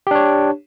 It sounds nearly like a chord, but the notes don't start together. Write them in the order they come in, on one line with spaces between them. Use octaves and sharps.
G4 D4 C#5